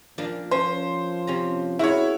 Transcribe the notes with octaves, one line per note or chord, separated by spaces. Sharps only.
A#2 F3 A#3 D4
F3 C#4 C5
C3 C#4 A#5
E4 F#4 G#4 A#4 B4 C#5